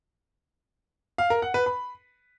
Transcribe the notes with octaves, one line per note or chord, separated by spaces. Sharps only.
F5
A#4
F#5
B4
B5